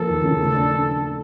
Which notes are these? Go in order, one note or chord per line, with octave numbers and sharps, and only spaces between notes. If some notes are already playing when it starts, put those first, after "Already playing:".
Already playing: F3 A#3 A4
D#2
C#3
A3
D4